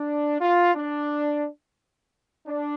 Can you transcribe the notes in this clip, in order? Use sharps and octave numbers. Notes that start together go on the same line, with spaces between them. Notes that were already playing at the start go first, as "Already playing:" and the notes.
Already playing: D4
F4
D4
D4